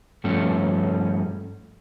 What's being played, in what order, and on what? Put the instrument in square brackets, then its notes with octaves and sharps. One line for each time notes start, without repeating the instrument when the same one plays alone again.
[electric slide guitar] G2 F3 A3 C#4